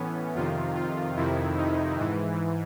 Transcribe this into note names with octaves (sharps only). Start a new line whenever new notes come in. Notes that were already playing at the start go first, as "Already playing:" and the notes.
Already playing: A2 E3 B3 C#4
F2 C3 D#3 F4
F4
F2 C3 D#3 E4
D#4
G#2 E3